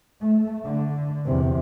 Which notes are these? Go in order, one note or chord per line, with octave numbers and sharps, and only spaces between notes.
A3
D3
E2 C3